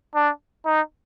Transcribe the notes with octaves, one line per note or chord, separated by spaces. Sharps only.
D4
D#4